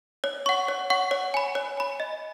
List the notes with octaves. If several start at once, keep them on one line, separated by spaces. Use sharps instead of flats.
C#5
F#5 C#6
C#5
F#5 C#6
C#5
G#5 B5
C#5
G#5 B5
D#5